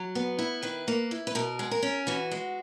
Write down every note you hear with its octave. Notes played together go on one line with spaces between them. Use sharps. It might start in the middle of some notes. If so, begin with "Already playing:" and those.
Already playing: F#3
B3
E4
D#3 B4
A#3
E4
B4
B2 A#4
G#3
A#4
C#4
E3 F#4
G#3